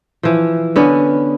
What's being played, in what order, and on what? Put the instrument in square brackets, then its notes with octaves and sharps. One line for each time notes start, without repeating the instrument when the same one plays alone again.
[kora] E3 F3
D3 B3 C#4